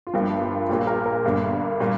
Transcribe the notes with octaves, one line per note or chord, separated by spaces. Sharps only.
F4
G1 G2 F3 A#3 G4
F4
A#1 A#2 A#3 G4
A#4
A#4
G1 G2 D3 A#3
A#2 G3 A#3